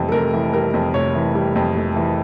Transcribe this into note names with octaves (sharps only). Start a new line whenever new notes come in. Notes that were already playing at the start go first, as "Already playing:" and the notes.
Already playing: F1 F2 E3 G3
A4
F1 A#4
E3
G3 A#4
F2
F1 C#5
E3
G3
F2
F1
E3